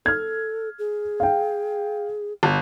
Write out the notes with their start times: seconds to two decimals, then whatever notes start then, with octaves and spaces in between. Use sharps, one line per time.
0.06 A4 F6 G#6
0.79 G#4
1.20 F5 G5
2.43 G1